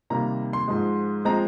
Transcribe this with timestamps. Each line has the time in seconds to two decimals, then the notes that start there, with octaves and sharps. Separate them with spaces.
0.10 C3 D#3 G3 A#3 A#5
0.53 C6
0.68 G#2 F3 G#3
1.25 F3 G#3 C4 A#5